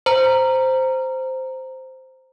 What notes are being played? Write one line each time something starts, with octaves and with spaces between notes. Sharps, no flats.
C5 A#5